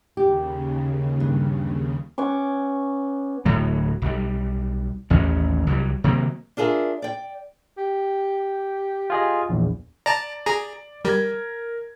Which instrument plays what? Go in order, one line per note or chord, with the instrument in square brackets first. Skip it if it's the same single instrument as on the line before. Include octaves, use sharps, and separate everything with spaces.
[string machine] D#2 C#3 [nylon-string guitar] G4
[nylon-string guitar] G2
[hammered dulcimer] B3 C#4 C#6 D6
[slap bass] D1 A2 F#3
B1 G3
A1 D#2 C#4
C2 F#3 G3
C3 D#3 F#3 A#3
[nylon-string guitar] D4 F4 G#4 A#4 E5
D5 G5
[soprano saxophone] G4
[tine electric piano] F4 G#4 D#5
A#1 E2
[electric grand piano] D5 [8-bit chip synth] A5 A#5
[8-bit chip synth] G#4 A#5
[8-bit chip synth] G3 [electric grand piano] A#4 G#6